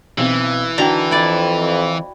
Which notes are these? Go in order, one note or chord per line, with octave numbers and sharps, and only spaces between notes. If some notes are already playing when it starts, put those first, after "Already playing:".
B1 E3 C4
D3 D#3 F#4 G5 A#5
F2 E4 D5